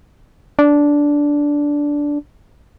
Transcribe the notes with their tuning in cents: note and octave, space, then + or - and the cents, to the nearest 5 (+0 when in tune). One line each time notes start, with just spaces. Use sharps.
D4 -10